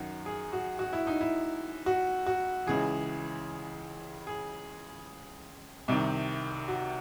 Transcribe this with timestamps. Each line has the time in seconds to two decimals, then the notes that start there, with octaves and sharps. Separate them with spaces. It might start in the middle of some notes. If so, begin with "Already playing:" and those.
Already playing: F#2 D#3 F#4
0.26 G#4
0.53 F#4
0.79 F#4
0.93 E4
1.07 D#4
1.21 E4
1.86 F#4
2.26 F#4
2.67 C#2 C#3 E3 G#4
4.27 G#4
5.88 C2 C3 D#3
6.68 F#4